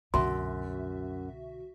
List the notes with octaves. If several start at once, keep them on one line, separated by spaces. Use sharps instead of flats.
C2 F#2 B2 D3 F#4 E5 C6